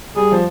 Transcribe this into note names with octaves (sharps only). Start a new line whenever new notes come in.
G3 G#4
F3